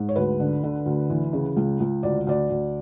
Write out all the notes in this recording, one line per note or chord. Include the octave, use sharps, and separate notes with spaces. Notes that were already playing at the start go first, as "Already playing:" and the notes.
Already playing: G#2
C#5
D2 B4
D3
D3
D2
E3
C#3
C#2
C#2
D2 D5
D2 D5
D2